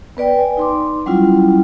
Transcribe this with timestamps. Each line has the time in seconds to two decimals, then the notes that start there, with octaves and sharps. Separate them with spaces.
0.17 B3 B4 D5 G5
0.36 G#5
0.57 D#4 C6 D6
1.06 F#3 G3 C#4 E4 F4